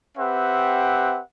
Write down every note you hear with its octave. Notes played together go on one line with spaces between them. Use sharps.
C4 G4 B4 E5 F#5